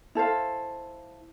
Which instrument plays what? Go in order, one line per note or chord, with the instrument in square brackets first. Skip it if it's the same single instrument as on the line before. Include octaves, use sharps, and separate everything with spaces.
[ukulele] E4 A4 C5 F5